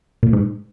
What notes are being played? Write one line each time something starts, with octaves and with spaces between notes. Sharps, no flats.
A#2
G#2